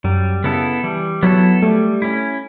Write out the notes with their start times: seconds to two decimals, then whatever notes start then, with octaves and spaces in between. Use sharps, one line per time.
0.04 F#2 G3
0.44 C#3 B3 E4 A4
0.84 E3 G3
1.23 F#3 B3 E4 A4
1.62 G3 A3
2.02 C#4 E4